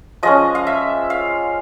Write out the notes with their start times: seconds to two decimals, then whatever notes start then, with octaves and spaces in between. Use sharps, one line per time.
0.23 F3 G#3 C#4 D#5
0.55 F5
0.67 E5
1.10 F5